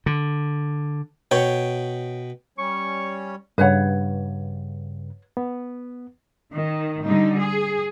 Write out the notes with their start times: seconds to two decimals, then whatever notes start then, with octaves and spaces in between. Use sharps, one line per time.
0.06 D3
1.31 B2 C#5 G5
2.58 G3 C#4 C#5 C#6
3.58 G2 C#3 B4 C#5 F#5
5.37 B3
6.53 D#3
7.04 D3 G3 D#4
7.40 G#4